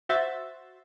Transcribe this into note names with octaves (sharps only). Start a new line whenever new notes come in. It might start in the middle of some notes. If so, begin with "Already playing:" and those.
F#4 C5 E5 A6